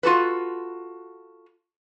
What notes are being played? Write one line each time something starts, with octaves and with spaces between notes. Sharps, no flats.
F4 F#4 A4 B4